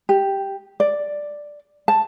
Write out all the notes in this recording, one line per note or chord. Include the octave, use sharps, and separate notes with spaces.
G4
D5
A5